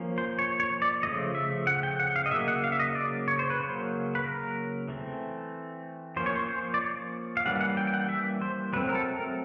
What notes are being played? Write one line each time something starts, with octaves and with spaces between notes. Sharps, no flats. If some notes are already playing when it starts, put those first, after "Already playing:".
Already playing: F3 A#3 C#4
C5
C#5
C#5
D5
C#3 F3 A3 D#5
E5
F#5
G5
F#5
F5
D#5
C#3 F#3 A#3 E5
F#5
F5
E5
D#5
D5
C#5
C5
B4
C#3 F#3 A#3 C#4 C5
B4
A#4
E3 A3 C4
F3 A#3 C#4 C5
C#5
C5
C5
D5
C#5
F5
E3 G3 A#3 C#4 F#5
F#5
G5
G5
F#5
E5
C5
F#3 A3 C4 B4
A#4
A4
A#4